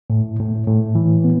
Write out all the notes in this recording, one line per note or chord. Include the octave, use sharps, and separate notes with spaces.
A2
A2
A2
E3
B3